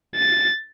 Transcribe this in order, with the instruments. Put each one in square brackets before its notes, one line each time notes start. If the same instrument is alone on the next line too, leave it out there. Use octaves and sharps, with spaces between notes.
[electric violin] A6